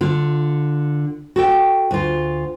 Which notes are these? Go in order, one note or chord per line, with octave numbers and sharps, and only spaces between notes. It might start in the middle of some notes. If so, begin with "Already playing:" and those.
D3 F4
F#4 A4 G5
D2 F4